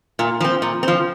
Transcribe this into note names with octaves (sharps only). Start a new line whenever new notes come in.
A#2
F3 C4
A#2
F3 C4